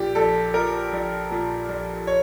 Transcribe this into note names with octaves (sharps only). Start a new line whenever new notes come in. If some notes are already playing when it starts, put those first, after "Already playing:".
Already playing: A#1 A#2 G4
A#1 A4
F3 A#4
A#1
A#2
A#1
C#5